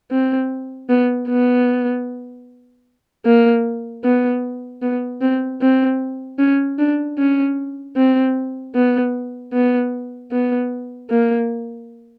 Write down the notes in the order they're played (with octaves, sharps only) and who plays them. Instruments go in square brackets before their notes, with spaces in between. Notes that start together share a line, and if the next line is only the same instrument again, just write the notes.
[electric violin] C4
B3
B3
A#3
B3
B3
C4
C4
C#4
D4
C#4
C4
B3
B3
B3
A#3